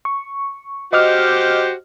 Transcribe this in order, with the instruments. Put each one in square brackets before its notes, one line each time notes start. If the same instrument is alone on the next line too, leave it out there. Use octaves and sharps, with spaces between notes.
[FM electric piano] C#6
[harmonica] F#4 G4 C5 [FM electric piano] D#5 D6 F6